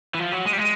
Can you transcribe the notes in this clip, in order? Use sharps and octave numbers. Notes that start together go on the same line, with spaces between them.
E3
F3
F#3
G#3
G3
G#3